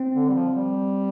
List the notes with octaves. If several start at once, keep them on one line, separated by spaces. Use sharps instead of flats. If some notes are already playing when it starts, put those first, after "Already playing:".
Already playing: C4
D3
G3
F3
G3